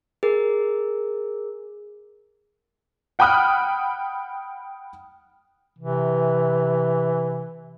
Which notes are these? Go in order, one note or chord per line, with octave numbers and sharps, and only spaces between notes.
G#4 A#4
F#5 G5 B5 D#6 F6 F#6
C3 E3